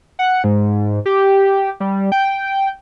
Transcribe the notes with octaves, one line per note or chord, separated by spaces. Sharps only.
F#5
G#2
G4
G3
G5